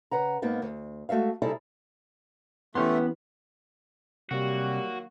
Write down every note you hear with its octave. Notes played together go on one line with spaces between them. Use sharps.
C#3 B4 F#5 A#5
G#2 A#3 B3 D#4
D2
G#3 A3 F#4 E5 F5
C3 G3 D#4 E4 G#4 A4
E3 A3 B3 C#4 G4 C6
C3 D#3 F#3 G3 A#3 F#4